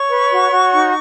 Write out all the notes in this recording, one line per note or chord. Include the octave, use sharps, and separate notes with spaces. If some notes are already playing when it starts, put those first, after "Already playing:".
Already playing: C#5 C#6
B4
F#4
F#4
D#4